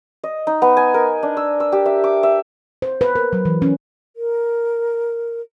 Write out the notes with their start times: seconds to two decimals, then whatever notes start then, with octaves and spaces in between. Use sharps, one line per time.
0.24 D#5
0.47 D#4
0.62 B3
0.77 G#5
0.94 A#4
1.23 D4
1.37 E6
1.60 E6
1.72 G4
1.86 E5
2.04 D6
2.23 E5
2.82 C5
3.01 B4
3.15 A#4
3.33 F#3
3.45 E3
3.62 C#4
4.16 A#4